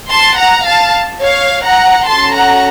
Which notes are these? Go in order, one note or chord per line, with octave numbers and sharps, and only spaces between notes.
A5 C6
F#5 A#5
F5 A5
C#5 F5
F#5 A#5
C#4 F#4 A4 A5 C6
F#5 A#5